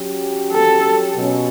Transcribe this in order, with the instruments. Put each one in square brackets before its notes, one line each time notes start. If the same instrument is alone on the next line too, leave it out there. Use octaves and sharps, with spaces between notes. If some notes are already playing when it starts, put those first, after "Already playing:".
Already playing: [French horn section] F#3 C#4 G4
[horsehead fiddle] A4
[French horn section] B2 F#3 C#4